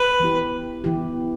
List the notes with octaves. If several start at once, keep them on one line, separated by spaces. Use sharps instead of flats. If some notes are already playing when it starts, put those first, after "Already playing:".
Already playing: B4
E3 B3 E4 G4
E3 B3 E4 G4